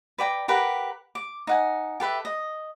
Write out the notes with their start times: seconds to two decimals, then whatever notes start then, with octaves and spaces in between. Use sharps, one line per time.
0.18 B4 D5 G5 A#5
0.48 G4 A#4 B4 F#5
1.15 D6
1.47 D#4 F#5 G#5
2.00 G4 A4 B4 E5
2.25 D#5